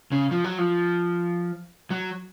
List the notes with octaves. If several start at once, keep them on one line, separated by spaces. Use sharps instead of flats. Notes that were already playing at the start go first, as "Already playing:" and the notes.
C#3
F3
F#3
F3
F#3